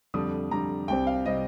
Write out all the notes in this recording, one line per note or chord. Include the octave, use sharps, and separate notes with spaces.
F2 D3 G3 D4 D#6
F2 D3 G3 D4 A#5
C2 C3 G3 C4 G5
F5
C3 G3 C4 D#5